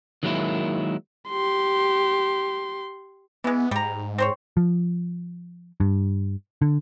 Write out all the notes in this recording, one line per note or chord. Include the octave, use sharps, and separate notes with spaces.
D#3 F#3 G#3 A#3 D#4 E4
G4 C6
E3 G#3 B3
G#2 G3 A#5
C4 C5 C#5
F3
G2
D3